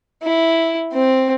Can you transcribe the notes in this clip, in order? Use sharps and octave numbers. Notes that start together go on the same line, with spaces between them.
E4
C4